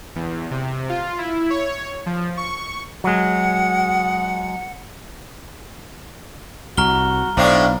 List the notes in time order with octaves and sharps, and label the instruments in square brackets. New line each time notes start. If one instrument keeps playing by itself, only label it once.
[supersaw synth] E2
C3
F4
E4
C#5
F3
C#6
[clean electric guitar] F#3 G#3 [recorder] F#5
[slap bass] C2 [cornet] F#4 [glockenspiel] A#5 F6 G7
[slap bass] B1 [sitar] A2 C4 D4 [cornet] F5